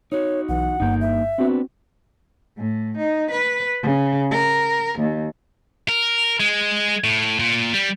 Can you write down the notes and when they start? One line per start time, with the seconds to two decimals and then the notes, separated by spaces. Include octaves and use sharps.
0.12 D#4 F#4 C#5
0.49 B1 E3 F#5
0.80 G1 G2 A#3 D#4 G6
1.01 E5
1.38 B3 C4 D4 F#4 B4
2.58 A2
2.97 D#4
3.30 B4
3.83 C#3
4.31 A#4
4.99 D#2
5.89 A#4
6.40 G#3
7.04 A2
7.39 A#2
7.74 G3